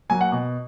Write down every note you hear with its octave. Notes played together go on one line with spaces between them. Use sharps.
F#3 A#3 G#5
F#5
B2